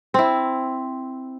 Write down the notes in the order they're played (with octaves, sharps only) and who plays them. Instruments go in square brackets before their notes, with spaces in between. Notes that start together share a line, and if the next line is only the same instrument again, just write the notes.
[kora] C4 E4